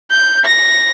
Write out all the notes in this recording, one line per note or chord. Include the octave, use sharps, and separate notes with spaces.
G6
A#6